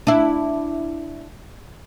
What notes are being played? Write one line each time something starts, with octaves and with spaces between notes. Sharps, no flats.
D4 E4